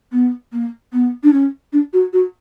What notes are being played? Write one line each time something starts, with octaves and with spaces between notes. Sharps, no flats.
B3
A#3
B3
D4
C#4
D4
F#4
F#4